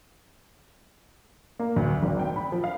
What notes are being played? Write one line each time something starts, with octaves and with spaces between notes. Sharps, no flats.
A#3
D2
G#1
G5
B5
F3
F5